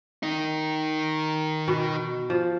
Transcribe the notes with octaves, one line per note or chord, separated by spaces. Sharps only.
D#3 D#4
B2
F3